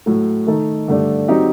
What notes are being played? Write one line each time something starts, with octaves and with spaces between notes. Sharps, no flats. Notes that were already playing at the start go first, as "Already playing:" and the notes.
A2 F#3 A3
D#3 A3 D#4 A4
G2 D3 A3 D4
F#3 C4 D#4 G4